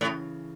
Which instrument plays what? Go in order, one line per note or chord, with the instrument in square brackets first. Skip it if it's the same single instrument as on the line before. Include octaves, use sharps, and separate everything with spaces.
[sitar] A2 [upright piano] C#3 E3